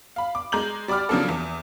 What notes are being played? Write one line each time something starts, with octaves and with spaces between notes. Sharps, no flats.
F5 B5
D6
G#3 A#5 G6 F#7
G3 D5 B5 D6 F6
C#3 F3 F#3 A#3 D4 A4
E2